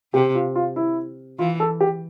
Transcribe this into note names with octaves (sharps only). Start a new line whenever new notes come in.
C3 G4
F4
F4
E4
E3 F4
A4
G4